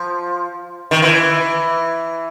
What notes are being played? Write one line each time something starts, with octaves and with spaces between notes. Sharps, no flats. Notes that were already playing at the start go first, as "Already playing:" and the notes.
Already playing: F3
D#3
E3